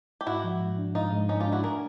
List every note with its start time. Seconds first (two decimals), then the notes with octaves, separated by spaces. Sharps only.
0.21 G4
0.27 G#2 E4 F#4
0.44 F3
0.61 G#2
0.78 D4
0.95 G#2 D#4 F4
1.12 G#2
1.29 G#2 C#4 D#4
1.40 F4 G4
1.47 D4
1.52 E4 F#4
1.63 A3 G#4 A#4